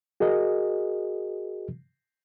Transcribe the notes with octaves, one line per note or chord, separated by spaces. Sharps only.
F#4 G#4 A#4 D#5